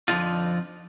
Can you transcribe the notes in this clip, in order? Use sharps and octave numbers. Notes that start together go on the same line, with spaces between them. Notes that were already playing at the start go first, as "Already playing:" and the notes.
F2 D3 F3 A3 D#4 F4